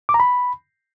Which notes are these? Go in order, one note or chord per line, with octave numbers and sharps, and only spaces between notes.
D6
A#5
B5